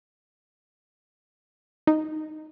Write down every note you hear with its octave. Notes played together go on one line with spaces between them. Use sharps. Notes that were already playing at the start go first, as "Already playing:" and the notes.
D#4